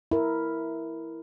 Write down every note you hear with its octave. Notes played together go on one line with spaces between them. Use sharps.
E4 A#4